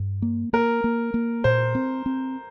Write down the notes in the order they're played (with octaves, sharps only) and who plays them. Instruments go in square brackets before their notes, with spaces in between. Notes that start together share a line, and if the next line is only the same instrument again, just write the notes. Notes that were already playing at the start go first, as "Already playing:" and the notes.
Already playing: [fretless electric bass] G2
A#3
[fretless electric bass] A#3 [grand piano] A#4
[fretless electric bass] A#3
A#3
[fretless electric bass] A#2 [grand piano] C5
[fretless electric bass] C4
C4